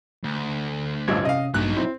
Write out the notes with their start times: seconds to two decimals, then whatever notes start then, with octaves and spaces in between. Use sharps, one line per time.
0.24 D2
1.08 A1 G2 F3 D#5 E6 G#6
1.25 C3 C#4 D#5 F5 D#6
1.54 A1 G2 F#3 A#3 D#4 F#6
1.77 C4 E4